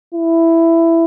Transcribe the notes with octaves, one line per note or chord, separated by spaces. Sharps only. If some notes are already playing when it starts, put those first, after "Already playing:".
E4